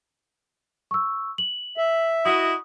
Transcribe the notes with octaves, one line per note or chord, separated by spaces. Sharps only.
C#6 E6
F#7
E5
E4 F#4 D#5 D#6